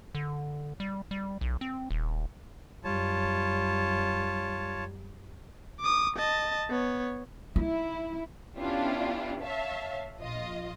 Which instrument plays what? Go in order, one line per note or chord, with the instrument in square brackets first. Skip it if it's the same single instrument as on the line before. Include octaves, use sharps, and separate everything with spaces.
[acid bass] D3
G3
G3
B1
C4
D#1
[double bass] F#2 G3 [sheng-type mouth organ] F4 C#5 A5
[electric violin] D6 D#6
D#5 A5
B3 C#5
[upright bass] D#4 [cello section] E4
[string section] B3 C#4 D4 E4 F4 G4
C#5 E5 F5 A5
A#1 F4 D#5